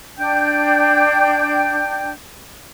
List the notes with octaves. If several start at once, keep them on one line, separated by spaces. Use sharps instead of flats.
D4 G5 G6